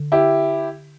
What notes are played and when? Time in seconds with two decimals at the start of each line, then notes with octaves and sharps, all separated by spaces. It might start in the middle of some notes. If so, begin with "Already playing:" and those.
Already playing: D3
0.12 E4 G4